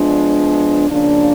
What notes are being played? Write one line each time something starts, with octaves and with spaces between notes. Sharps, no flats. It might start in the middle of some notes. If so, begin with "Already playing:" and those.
Already playing: F3 G#3 B3 D4 F4
C#3 F3 A#3 D4